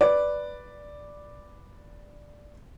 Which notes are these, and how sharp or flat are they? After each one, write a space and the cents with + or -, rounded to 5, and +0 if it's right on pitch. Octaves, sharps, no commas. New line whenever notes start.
B4 +0 D5 +0